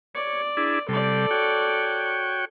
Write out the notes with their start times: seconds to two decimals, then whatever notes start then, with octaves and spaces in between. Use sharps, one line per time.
0.15 C#5 D5
0.57 D4 E4 G#4
0.89 C3 G3 A4 D5
1.31 F#4 C#5 G5